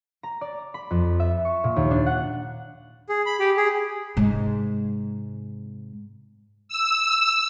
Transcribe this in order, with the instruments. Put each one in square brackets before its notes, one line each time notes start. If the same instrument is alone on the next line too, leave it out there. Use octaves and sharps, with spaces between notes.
[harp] A#5
D5
B5
F2
E5
C#6
A#2
D#2
D4
F#5
[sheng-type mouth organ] G#4
B5
G4
G#4
[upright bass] G#2 C3
[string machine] E6